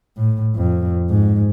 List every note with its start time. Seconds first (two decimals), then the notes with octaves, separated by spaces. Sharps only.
0.17 A2
0.56 F2
1.10 G#2